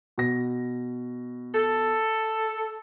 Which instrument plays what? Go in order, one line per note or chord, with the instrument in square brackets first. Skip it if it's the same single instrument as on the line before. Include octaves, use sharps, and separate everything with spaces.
[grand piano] B2 A#6
[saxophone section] A4